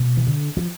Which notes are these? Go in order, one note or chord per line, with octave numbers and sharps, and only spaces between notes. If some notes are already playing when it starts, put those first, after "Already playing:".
Already playing: B2
E3
D3
F3